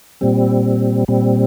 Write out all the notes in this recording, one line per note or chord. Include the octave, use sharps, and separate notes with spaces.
A#2 G3 C4
A#2 G3 C4